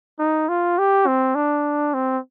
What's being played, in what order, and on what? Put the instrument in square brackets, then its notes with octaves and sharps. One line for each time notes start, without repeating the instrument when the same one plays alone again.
[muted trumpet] D#4
F4
G4
C4
D4
C4